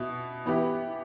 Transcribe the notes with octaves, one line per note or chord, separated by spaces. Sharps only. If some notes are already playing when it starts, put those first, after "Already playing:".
Already playing: B2 B3 E4
E3 B3 E4 G4